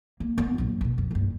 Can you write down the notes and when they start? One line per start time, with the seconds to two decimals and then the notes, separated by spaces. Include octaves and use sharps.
0.20 A#3
0.38 B3 C#4
0.58 A#1 F#2
0.81 B2 D3
0.98 F2
1.11 F#1 G2